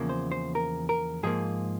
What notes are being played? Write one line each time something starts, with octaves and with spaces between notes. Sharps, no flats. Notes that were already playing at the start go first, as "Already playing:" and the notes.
Already playing: E2 C#3 F3 A#3
C5
C5
A#4
A#4
G#2 F3 A#3 G#4